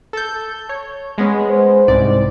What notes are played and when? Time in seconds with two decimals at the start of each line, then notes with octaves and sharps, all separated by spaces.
0.13 A4 G6
0.69 C#5
1.18 G#3 B3 C#4
1.49 C5
1.88 C2 G#2 D5